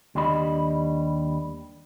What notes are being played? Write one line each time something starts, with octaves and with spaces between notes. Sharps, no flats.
D#2 G3 D4 G4 D#5 B5